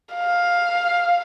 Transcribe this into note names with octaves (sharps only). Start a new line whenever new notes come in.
F5